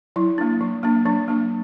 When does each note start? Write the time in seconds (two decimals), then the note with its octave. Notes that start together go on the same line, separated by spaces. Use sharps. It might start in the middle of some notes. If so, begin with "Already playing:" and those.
0.16 F#3 E4
0.38 A#3 D4
0.61 F#3
0.83 A#3 D4
1.05 F#3 D4
1.28 A#3 D4